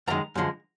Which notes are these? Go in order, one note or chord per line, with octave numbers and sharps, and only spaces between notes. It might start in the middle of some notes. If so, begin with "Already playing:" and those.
F#2 D#3 G#3 A#5
F#2 D3 F3 G#3